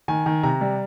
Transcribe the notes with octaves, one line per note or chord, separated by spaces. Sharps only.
D#3 G#5
D#3
C3 A#5
G3